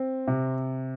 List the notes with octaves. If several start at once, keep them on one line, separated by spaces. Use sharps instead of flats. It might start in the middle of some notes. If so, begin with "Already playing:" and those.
Already playing: C4
C3